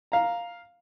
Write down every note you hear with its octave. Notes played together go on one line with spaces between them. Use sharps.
F5 A#5